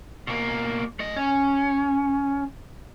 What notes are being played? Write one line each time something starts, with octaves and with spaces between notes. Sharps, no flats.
B2 A#3
A3 D#5
C#4